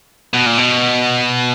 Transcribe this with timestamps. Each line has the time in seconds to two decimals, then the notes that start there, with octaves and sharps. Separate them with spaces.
0.34 B2
0.46 A#2
0.58 B2